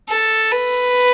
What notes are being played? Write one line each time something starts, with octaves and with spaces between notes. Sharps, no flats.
A4
B4